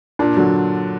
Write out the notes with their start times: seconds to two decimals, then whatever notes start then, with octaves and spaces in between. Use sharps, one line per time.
0.19 A#2 D4
0.37 D3 F#3